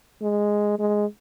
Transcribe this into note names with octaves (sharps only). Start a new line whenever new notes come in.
G#3
G#3